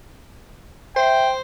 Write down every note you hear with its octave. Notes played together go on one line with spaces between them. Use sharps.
C5 E5 G5